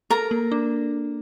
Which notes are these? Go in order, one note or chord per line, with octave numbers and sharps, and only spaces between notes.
A4 A#4 A#5
A#3
D4